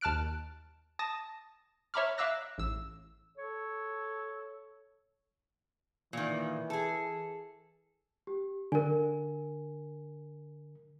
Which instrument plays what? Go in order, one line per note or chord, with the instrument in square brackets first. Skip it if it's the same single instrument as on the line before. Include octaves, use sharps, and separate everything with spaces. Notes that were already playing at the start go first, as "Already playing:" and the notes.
[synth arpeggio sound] D#2 A5 F6 F#6 D7
A5 D#6 A6 A#6
C#5 E5 A#5 B5 D6 F6
E5 F5 D6 E6 F#6 A#6
A1 E6
[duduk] A4 [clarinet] C#5
[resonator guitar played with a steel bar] A#2 D#3 [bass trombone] E3
[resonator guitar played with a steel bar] G#4 A4
[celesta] G4
[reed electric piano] D3 [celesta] A#4 G#5